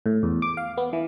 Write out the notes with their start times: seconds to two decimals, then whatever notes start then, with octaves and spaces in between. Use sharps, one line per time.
0.06 A2
0.23 E2
0.42 D6
0.57 F5
0.77 B3
0.93 E3